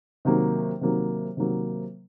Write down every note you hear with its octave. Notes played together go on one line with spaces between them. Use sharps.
C3 D#3 F#3 A#3
C3 D#3 F#3 A#3
C3 D#3 F#3 A#3